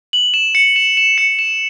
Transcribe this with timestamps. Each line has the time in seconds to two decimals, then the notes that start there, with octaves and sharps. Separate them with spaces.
0.13 F#7
0.34 E7
0.55 C#7
0.76 E7
0.97 E7
1.18 C#7
1.39 E7